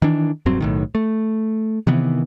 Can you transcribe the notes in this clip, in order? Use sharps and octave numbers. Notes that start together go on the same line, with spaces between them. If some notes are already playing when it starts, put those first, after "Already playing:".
D#3 E3 D4
E1 G2 F#3 C4
B1 A2 D#3
A3
C3 D#3 E3 B3